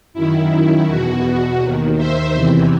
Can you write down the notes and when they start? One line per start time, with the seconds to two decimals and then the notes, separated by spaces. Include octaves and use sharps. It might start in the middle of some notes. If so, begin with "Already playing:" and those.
0.14 F#2 D#3 E4
0.87 E2 B2 F#4
1.24 F#4
1.60 D#2 D#3
1.97 C5 E5
2.33 E2 C3 E3